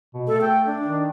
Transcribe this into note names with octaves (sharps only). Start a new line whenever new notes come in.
B2
A3 A4
G5
D4
D#3